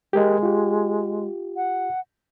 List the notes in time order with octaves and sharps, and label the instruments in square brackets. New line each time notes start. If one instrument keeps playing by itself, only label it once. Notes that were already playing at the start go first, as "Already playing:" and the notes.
[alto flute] G#3 [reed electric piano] G4 A#4 D#5
[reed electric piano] F4 G4
[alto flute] F#5